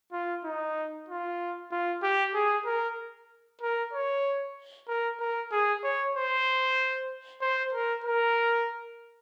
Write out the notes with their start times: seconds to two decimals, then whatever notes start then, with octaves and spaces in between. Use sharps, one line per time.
0.12 F4
0.44 D#4
1.08 F4
1.71 F4
2.02 G4
2.34 G#4
2.66 A#4
3.61 A#4
3.93 C#5
4.88 A#4
5.20 A#4
5.52 G#4
5.83 C#5
6.15 C5
7.41 C5
7.72 A#4
8.04 A#4